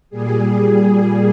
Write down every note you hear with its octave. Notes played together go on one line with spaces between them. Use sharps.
A#2 G3 G#4